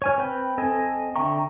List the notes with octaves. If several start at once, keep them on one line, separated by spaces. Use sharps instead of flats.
C#5 G#5 F6
C4 B4 G5 G6
C4 A4 D#5 G#5
D3 E5 G5 A#5 C#6